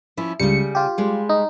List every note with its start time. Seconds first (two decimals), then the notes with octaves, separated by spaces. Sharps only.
0.17 F3 C#4 E4
0.40 C#2 C#3 G3 C#7
0.75 F4 G4
0.98 G3 G#3
1.29 D#4